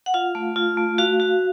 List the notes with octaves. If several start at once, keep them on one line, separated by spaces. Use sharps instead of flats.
F#5
F4 F5
A3
F4
A3
F#4 F5
F#4